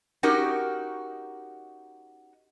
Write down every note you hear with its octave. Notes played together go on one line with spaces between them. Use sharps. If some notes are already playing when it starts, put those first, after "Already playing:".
C#4 D#4 F#4 G4 A#4